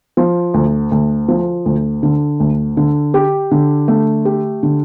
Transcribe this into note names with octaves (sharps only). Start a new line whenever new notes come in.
F3
D2
D2
F3
D2
D3
D2
D3
G4
D3
A3
G4
D3